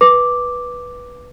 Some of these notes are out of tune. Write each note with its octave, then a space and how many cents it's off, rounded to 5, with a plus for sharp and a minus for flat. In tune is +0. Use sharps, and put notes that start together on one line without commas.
B4 -10 D6 +0